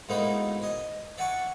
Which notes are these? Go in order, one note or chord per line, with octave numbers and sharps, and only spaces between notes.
G#2 B2 A3 A#3 D#4 E4
D#5 G#5
D5 E5 F#5 G#5 A5 C#6